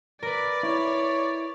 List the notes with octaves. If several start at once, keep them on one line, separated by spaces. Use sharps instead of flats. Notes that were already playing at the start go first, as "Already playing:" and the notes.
A#4 B4 D5
E4 C#5